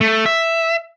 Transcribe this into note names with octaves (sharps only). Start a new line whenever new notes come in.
A3
E5